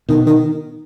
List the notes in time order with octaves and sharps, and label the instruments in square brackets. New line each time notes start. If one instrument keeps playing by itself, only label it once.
[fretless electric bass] B2 [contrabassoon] D#3
[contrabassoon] D#3